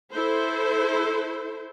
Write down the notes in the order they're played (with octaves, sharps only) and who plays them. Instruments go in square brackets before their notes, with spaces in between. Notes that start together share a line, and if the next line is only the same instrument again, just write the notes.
[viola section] E4 A4 C5